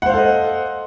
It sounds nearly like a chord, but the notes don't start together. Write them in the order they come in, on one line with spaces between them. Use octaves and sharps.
F#5 C5 F5 A4 D#5